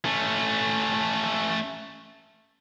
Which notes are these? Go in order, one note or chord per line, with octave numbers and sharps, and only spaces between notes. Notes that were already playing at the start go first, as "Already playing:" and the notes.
A3 C#4